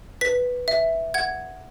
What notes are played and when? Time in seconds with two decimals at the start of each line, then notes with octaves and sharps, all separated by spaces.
0.21 B4 B6
0.68 E5
1.14 F#5 G#6